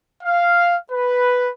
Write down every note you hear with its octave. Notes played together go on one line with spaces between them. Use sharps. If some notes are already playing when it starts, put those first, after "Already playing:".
F5
B4